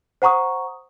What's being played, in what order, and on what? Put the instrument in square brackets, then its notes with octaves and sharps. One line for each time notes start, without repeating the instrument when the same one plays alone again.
[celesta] C5 F#5 A#5 C#6 D#6